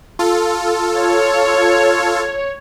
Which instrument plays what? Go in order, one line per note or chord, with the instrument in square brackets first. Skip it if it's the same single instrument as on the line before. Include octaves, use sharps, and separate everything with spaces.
[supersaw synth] F4 A4
[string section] C#5